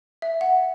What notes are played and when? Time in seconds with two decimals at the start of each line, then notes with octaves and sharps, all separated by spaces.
0.22 E5
0.41 F#5